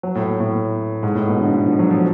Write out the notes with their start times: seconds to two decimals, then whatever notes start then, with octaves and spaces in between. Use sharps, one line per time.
0.03 F#3
0.15 A2
0.40 A2
1.03 G#2
1.15 A2
1.28 B2
1.41 D3
1.54 D3
1.66 F3
1.79 F#3
1.90 F3